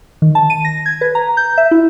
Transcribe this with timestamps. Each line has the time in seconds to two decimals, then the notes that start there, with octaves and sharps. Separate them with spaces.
0.22 D#3
0.35 A5
0.50 D#7
0.65 A#6
0.86 G#6
1.01 B4
1.15 A#5
1.37 G6
1.58 E5
1.71 E4